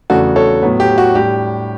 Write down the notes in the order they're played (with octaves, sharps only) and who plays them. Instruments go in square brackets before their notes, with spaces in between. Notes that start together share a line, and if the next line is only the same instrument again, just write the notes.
[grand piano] E2 C#3 F#3 A3 D4 F#4 A4
A4 C#5
A2 F#3 B3
G4
F#4
A2 G3 D4 G4